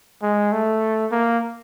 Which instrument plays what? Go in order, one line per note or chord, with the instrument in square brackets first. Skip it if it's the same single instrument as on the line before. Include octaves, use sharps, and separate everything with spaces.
[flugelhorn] G#3
A3
A#3